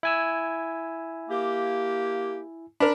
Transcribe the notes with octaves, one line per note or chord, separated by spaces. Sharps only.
E4 G#5 E6
A#3 G4
D4 A#4 B5